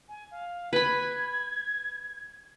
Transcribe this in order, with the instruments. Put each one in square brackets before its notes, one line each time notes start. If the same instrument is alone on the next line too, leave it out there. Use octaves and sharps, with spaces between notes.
[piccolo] G#5
F5
[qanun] B4 B5 [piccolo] G#6